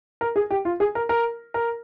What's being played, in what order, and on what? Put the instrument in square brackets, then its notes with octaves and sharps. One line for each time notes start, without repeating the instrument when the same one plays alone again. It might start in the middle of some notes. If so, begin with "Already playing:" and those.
[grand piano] A#4
G#4
G4
F4
G#4
A#4
A#4
A#4